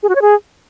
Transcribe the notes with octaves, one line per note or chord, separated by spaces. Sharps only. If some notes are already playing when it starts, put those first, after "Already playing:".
G#4
F#4
C#5
G#4